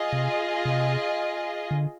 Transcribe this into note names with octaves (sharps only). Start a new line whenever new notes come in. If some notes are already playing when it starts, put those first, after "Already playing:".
Already playing: F4 G#4 D#5
C3
C3
D3